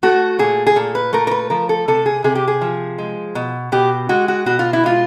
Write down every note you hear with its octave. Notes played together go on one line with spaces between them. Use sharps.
A3 F#4
A#2 G#4
G#4
A#2 A4
B4
A3 A#4
A#4
B4
F3 A#4
A4
C3 A4
G#4
C3 G#4
G4
G#4
F3
G#3
B2
B2 G4
G#3 F#4
F#4
B2 F#4
F4
E4
G#3 F4